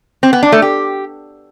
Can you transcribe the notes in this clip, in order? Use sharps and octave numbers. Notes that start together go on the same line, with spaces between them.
C4
B3
D4
A3
G4